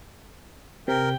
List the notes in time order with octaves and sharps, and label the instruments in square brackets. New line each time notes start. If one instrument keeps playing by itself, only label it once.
[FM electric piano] C3 [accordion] A#4 [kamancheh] G5